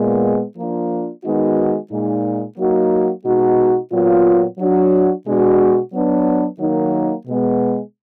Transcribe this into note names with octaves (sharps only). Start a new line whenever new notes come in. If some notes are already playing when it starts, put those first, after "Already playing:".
Already playing: A#2 G#3 B3
F3 A#3 D4 F4
D#3 G#3 B3 D#4 F#4
A#2 G#3 D#4
F#3 A#3 D#4 F#4
B2 G#3 D#4 F#4
A#2 F#3 B3 F4
F#3 D4 F#4
B2 G#3 D4 F#4
F#3 B3 D4
D#3 F#3 A#3 D#4
B2 G#3 B3